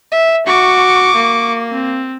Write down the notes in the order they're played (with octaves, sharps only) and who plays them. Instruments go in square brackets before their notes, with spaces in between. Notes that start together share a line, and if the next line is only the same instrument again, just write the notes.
[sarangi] E5
[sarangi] F#4 [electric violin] C#6 D6
[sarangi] A#3
[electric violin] C4